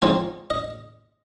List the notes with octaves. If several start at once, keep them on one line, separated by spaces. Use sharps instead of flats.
F3 G#3 C4 D#4 G#5
D#5